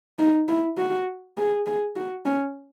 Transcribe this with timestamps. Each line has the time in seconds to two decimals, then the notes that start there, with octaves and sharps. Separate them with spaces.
0.19 D#4
0.48 E4
0.78 F#4
1.37 G#4
1.66 G#4
1.96 F#4
2.26 C#4